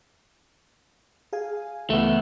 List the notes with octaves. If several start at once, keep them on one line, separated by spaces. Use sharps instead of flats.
G#4 F5 G#5
C#2 E3 A3 B3